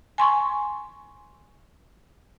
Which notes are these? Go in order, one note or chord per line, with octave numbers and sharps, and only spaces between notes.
G#5 C6 C#6